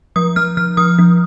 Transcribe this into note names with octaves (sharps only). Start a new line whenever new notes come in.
F3 D#6
F3 F6
F3 F6
F3 D#6
F3